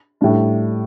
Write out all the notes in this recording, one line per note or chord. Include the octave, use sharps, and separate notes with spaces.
A2 G3 D4